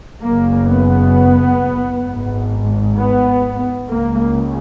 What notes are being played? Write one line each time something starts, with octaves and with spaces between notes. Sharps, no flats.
F#1 F#2 C#3 A#3
B3
G#1 G#2
B3
C#2 C#3 A#3